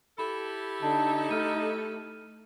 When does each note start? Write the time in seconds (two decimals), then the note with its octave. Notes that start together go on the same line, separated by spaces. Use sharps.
0.18 E4 G4 A4 B5
0.82 D3 D#4 A5
1.31 A3 F6 D#7